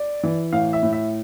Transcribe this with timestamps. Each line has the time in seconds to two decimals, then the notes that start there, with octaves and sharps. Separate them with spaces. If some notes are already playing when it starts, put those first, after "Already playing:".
Already playing: D5
0.23 E3
0.52 A2 F5
0.73 E5
0.83 A2
0.93 E5